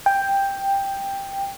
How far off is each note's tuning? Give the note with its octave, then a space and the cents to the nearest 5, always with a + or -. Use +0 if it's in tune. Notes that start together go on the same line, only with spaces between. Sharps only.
G5 +10